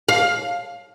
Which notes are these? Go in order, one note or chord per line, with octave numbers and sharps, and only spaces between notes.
F5